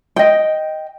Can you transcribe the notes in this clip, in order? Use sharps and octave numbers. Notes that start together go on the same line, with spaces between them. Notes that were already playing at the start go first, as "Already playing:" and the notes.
D#5 G5